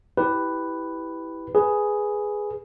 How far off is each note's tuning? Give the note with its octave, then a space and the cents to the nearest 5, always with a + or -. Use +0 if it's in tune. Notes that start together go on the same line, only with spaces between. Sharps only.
E4 -10 G4 +0 B4 +5
G#4 +0 B4 +0